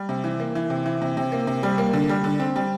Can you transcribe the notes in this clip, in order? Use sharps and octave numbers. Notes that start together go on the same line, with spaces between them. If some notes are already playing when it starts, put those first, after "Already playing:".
Already playing: G3
C3
E3
A#3
E3
C3
E3
C3
C3
A#3
C3
G3
A#3
D3
G3
D3
C4
G3